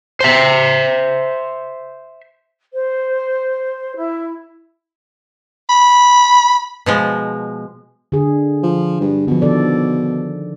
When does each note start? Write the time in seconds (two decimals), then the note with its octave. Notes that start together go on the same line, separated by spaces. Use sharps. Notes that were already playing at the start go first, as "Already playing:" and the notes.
0.20 C5 E5
2.74 C5
3.97 E4
5.70 B5
6.86 B2 F3 G#3
8.12 D3 G#4
8.63 F3
9.01 G2
9.27 B2 D3 F3
9.42 D#3 A4 D5